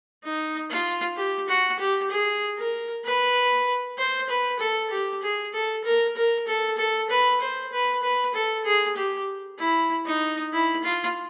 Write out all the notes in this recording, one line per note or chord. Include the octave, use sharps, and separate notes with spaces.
D#4
F4
G4
F#4
G4
G#4
A#4
B4
C5
B4
A4
G4
G#4
A4
A#4
A#4
A4
A4
B4
C5
B4
B4
A4
G#4
G4
E4
D#4
E4
F4